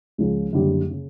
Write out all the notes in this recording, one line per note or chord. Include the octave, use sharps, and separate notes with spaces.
C#2 C#3 F3
F#1 F#2 D3 G3
C#3